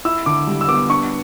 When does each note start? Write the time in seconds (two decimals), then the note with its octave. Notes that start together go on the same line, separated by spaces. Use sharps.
0.05 E4 E6
0.26 D3 D6
0.47 G3
0.61 E6
0.68 B3 D6
0.89 D4 C#6